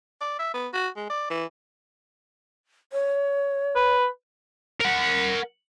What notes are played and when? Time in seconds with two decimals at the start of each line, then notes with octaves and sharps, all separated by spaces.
0.21 D5
0.39 E5
0.54 B3
0.73 F#4
0.97 G#3
1.10 D5
1.30 E3
2.93 C#5
3.75 B4
4.81 A#4 F#5